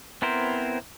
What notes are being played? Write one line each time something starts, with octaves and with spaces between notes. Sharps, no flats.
B3 C4 E4 A#4 C5